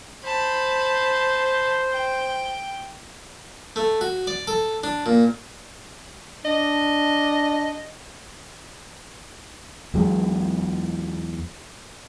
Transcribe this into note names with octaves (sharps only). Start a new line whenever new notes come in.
C5 A5 B5
G5
A3
F#4
D5
A4
D4
A#2
D4 D#5
E2 F#3 G#3